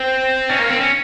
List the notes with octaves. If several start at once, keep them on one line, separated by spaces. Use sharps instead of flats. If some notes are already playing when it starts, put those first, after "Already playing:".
Already playing: C4
C#4
A#3
C4
C#4